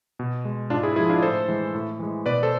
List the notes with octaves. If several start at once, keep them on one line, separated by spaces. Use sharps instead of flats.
B2
G#3
G#2 D4 F4
E4 G#4
F3 G#3 E4 G#4
D4 F4
A2 A4 C5
E3 G#3
A2
E3 G#3
B2 B4 D5
A4 C5